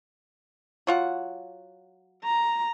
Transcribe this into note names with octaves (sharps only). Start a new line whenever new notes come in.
F#3 F4 F#5
A#5